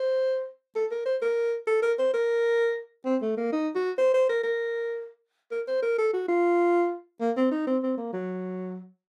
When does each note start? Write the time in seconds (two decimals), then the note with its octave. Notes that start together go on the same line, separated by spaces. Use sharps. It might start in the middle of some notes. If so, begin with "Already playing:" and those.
Already playing: C5
0.75 A4
0.91 A#4
1.06 C5
1.22 A#4
1.67 A4
1.82 A#4
1.99 C5
2.13 A#4
3.05 C4
3.22 A3
3.37 A#3
3.52 D#4
3.75 F#4
3.98 C5
4.14 C5
4.29 A#4
4.43 A#4
5.51 A#4
5.68 C5
5.82 A#4
5.98 A4
6.13 F#4
6.28 F4
7.20 A#3
7.37 C4
7.51 D#4
7.67 C4
7.83 C4
7.97 A#3
8.13 F#3